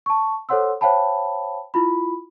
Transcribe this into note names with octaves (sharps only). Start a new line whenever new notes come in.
A5 C#6
A4 C5 C#5 F#5 C6 E6
C5 C#5 F5 G5 A5 B5
E4 F4 B5